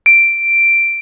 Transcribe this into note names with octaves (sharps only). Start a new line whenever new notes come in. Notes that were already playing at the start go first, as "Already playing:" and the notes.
D7